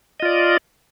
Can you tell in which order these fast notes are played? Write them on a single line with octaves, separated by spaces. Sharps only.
D#5 F4 D5